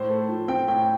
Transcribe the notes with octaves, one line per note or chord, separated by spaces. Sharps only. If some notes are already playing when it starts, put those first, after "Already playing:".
Already playing: A2 C5
A3
F3
C4 G5
A2 G5